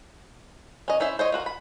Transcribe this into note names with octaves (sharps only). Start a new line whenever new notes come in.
C#4 D#5
C#4 E4 C5 E5
C5 C#5 D#5
F4 F#4 A#4
B5